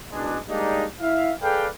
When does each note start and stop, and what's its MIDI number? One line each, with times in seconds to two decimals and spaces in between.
0.12 0.38 30
0.12 0.38 47
0.12 0.38 56
0.12 0.38 62
0.49 0.85 55
0.49 0.85 56
0.49 0.85 58
0.49 0.85 62
0.49 0.85 63
1.01 1.32 64
1.01 1.32 76
1.01 1.32 77
1.42 1.67 68
1.42 1.67 69
1.42 1.67 71
1.42 1.67 74
1.42 1.67 77
1.42 1.67 79